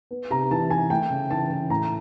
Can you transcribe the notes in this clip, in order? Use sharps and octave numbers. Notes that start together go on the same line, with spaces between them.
B3
C3 A#5
E3 A5
E3 G#5
A3 G5
C#3
E3 A5
E3
A2 A#5